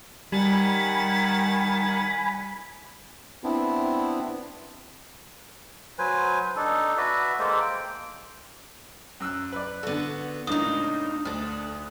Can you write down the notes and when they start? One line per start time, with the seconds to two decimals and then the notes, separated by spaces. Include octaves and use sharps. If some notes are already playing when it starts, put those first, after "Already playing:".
0.32 D#3 G3 F#5 G#5 B5 A6
3.44 B3 C4 D4 E4
5.98 F#3 B4 C5 G#5
6.56 D4 D#4 A4
6.97 F#4 B4 D5 E5
7.39 G#3 A#3 A4 C5
7.61 G5
9.20 F#2 E6 F#6
9.53 B4 D5
9.83 D3 B3 F#4 A4
10.47 C#2 A2 A#3 D4 D#4 D#6
11.25 D2 D4 A4